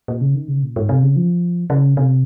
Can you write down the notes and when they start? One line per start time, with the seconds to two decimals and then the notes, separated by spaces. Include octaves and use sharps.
0.08 A#2
0.21 C#3
0.35 D#3
0.48 C#3
0.63 A#2
0.76 G#2
0.89 C3
1.03 C#3
1.16 F3
1.70 C#3
1.97 C3